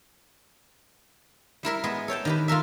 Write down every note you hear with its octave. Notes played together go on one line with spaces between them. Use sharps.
G3 E4 A#4 E5
G#3 B3 G#4
A4 C#5 G5 A5
D#3 G4 B4
F4 A4 A#4 E5